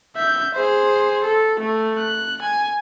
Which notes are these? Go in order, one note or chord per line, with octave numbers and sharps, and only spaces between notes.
E5 G6
G#4 C5
A4
A3
F#6
G#5